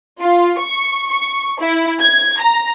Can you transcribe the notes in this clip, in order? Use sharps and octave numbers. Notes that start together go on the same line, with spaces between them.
F4
C#6
C#6
E4
G#6
A#5